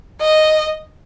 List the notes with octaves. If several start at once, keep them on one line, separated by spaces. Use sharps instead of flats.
D#5